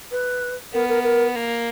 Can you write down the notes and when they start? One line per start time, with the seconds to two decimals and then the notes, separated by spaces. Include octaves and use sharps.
0.11 B4
0.73 B3 A#4
0.88 A#4
1.03 A#4
1.35 A#3